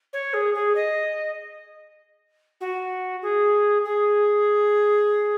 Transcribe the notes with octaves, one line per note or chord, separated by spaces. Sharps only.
C#5
G#4
G#4
D#5
F#4
G#4
G#4